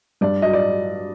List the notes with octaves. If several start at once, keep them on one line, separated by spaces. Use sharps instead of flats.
G2 D5
F#3 D#5
D5